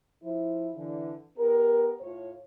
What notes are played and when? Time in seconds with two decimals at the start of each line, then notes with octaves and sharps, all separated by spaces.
0.22 F3 E4
0.75 D3 E3
1.38 B3 G4 A#4
2.00 A2 F4 C#5